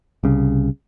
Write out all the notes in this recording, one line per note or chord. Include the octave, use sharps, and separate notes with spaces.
C2 C#3